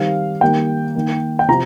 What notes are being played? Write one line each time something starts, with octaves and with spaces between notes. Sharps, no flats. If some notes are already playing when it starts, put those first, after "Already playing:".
Already playing: D#3 G3 C4 F5
D#3 G3 A#3 G5
D#3 A#3
G5
C3 F3 A#5